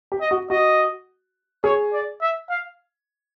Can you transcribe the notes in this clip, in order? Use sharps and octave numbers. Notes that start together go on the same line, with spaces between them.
G4
D#5
F#4
F#4 D#5
G#4 C#5
D5
E5
F5